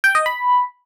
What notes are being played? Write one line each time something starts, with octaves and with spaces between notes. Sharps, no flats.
G5
D#5
B5